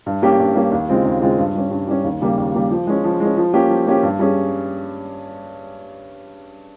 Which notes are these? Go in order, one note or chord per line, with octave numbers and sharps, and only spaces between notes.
G2
G3 A#3 C#4 G4
G2
G3 A#3 C#4 G4
D#2
C#3 G#3 C4 F4
D#2
C#3 G#3 C4 F4
G2
G3 C#4
G2
G3 C#4
D#2
C#3 G3 A#3
D#2
C#3 G3 A#3
F3
G#3 C#4
F3
G#3 C#4
F3
A#3 C#4 G4
F3
A#3 C#4 G4
G2
G3 C#4 G#4